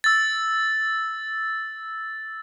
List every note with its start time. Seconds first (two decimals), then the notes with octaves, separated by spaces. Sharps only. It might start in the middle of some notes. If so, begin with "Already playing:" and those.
0.04 E6 A6